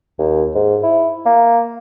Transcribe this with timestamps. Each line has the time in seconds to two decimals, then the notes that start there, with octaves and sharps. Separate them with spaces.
0.19 D#2
0.55 G#2
0.83 E4
1.26 A#3